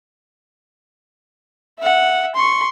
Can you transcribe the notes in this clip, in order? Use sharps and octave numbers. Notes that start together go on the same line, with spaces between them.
E5 F#5
C6 C#6